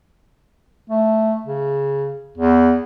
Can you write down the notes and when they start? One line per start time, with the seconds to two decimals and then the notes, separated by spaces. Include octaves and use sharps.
0.90 A3
1.46 C#3
2.38 E2